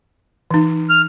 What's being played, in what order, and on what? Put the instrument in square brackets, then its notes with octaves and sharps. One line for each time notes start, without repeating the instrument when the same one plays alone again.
[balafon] E3 D#4
[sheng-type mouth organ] F6